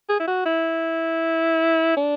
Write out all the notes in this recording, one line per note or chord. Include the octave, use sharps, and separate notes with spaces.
G#4
E4
F#4
E4
D4